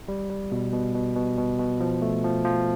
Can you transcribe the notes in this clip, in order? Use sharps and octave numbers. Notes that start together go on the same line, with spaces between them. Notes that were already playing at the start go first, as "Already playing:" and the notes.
G3
G3
B2
B2
B2
B2
B2
B2
F3
A3
F3
F3